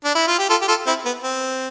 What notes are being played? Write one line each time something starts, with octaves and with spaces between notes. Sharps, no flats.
D4
E4
F4
G4
F4 A4
G4
F4 A4
C4 E4
B3
C4